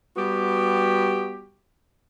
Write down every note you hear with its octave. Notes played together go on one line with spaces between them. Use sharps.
G3 B3 F#4 G4